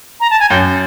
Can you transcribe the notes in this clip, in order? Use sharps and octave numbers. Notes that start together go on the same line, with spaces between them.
A#5
A5
G#5
F#2 G5